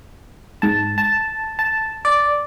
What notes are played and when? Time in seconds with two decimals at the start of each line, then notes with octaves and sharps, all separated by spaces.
0.62 G#2 A5
0.98 A5
1.59 A5
2.05 D5